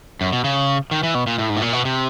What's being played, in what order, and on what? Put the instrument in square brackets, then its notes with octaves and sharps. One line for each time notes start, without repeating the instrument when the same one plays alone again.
[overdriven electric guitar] F#2
B2
C#3
D#3
E3
B2
A#2
A2
G#2
A2
A#2
B2
C3